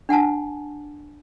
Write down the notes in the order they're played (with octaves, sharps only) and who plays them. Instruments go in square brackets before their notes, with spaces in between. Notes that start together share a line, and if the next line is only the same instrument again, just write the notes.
[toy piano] D4 F#5 G#5 A5